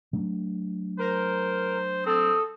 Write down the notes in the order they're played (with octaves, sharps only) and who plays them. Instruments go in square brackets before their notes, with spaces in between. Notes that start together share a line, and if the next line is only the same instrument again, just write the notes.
[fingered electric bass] F#3 A3 D4
[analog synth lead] A#4 [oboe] C5
[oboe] C4 [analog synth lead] A4 [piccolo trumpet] D#6